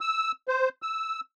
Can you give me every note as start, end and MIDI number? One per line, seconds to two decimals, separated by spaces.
0.01 0.32 88
0.48 0.69 72
0.82 1.20 88